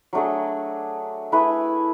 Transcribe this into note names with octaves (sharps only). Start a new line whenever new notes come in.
F#3 A3 D4 G#4
A3 E4 G#4 B4